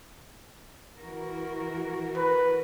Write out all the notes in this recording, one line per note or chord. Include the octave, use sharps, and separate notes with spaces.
E3 F#4 A#4
B4